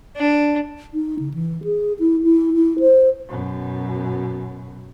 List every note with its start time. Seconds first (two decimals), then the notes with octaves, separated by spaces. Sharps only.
0.16 D4
0.94 D#4
1.19 C#3
1.34 E3
1.64 G#4
1.99 E4
2.24 E4
2.54 E4
2.79 C5
3.28 F#2 B2